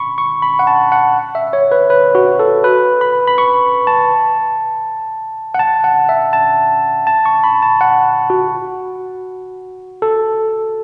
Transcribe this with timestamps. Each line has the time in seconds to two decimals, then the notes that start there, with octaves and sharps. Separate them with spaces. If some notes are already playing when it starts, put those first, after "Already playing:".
Already playing: B5 C#6
0.18 C#6
0.42 B5
0.59 F#5
0.67 A5
0.92 F#5
1.35 E5
1.53 C#5
1.72 B4
1.90 B4
2.15 F#4
2.39 A4
2.64 B4
3.01 B5
3.28 B5
3.38 C#6
3.87 A5
5.54 F#5
5.59 A5
5.84 F#5
6.09 E5
6.33 A5
7.07 A5
7.26 C#6
7.44 B5
7.63 A5
7.81 F#5
8.30 F#4
10.02 A4